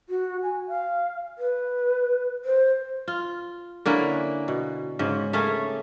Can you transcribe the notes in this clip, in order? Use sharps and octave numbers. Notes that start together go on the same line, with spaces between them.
F#4
G#5
F5
B4
C5
F4
D3 A#3 C#4 E4
B2
G#2 C#3
A3 A#3 C#4 G#4